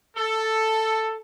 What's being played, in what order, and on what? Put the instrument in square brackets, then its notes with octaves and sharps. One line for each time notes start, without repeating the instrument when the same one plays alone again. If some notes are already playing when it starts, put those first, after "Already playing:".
[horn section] A4